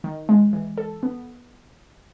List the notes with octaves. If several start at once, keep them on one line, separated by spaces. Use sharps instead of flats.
D#3
G#3
E3
A4
B3